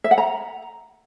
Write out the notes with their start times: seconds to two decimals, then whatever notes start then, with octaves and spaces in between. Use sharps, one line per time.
0.04 E5
0.11 F#5
0.18 A#5